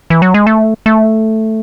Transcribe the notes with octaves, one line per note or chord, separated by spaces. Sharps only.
E3
F#3
G#3
A3
A3